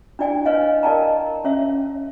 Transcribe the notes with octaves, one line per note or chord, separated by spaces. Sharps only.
D4 E4 D5 G5 G#5
B4 C#5 D#5 F5 G#5
A#4 D5 D#5 G5 A5 A#5
C#4 C#5 E5